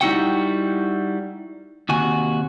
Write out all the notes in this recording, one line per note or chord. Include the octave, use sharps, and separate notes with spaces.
G3 D#4 E4 F#4 F#5 G5
D#2 C3 F#4 G#5